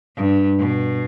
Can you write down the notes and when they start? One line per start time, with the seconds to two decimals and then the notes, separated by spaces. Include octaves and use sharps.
0.17 G2
0.59 B2